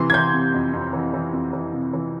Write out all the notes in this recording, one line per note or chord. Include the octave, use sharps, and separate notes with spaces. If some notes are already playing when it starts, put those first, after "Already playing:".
Already playing: C3 E3 C6
G#6
E3 G6
C3
F2
F2
E3
E3
F2
E3
C3
E3